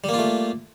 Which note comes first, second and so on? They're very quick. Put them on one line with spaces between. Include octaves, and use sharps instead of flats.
G3 A#3 F4 A3